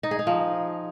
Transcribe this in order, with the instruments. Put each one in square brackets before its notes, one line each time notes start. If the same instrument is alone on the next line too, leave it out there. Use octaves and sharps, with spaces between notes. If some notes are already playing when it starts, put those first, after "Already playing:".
[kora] D#4
G#4
D#4
F3